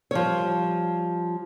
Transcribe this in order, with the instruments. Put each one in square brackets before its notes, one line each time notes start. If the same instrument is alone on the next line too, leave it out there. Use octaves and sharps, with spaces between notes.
[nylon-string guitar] F3 G3 C#5